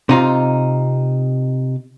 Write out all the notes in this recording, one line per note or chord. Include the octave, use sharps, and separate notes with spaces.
C3 D#4 F4